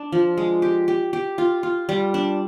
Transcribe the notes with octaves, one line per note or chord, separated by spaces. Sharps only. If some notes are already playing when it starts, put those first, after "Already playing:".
Already playing: D4
F3
G#3
G4
G4
G4
F4
F4
G3
D4